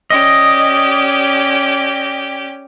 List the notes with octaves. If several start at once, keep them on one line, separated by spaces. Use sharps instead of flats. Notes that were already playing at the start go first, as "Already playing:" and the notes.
C#4 G4 D5 D#5